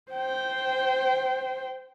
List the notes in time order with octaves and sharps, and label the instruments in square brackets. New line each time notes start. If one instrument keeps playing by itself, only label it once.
[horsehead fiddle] C5 G5